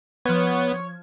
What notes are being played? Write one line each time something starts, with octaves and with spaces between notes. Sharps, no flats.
F3 B3 C#5 G#6